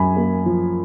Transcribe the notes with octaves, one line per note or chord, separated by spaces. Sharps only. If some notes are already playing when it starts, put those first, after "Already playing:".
Already playing: F#2 G#5 B5
A#3
F3